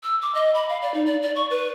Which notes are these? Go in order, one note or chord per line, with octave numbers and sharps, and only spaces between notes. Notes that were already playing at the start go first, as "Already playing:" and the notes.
E6
D6
D#5
B5
F5
D5
D#4
D5
D5
C#6
B4